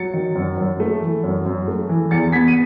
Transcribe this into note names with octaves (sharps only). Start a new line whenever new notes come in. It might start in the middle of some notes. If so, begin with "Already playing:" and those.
Already playing: F#3 A6 C#7
D#3
F#2
F#2
A3
E3
F#2
F#2
A3
E3
E2 A6 C#7
B3 G#6 B6
D#7